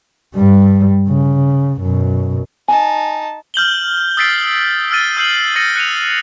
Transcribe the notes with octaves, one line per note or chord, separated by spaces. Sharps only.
G2 G3
C#3
F#2 B2
D#4 G#5 A5
F6 G6 F#7 G7
D#6 E6 A6 B6 C7 D7
E6 F6 A6 D#7
E6 G6 C7 F#7
E6 A6 A#6 C#7 D#7
F#6 C#7 D#7 F7